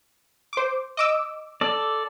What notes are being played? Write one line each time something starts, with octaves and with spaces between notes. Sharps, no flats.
C5 D6
D#5 D6 E6
A4 D5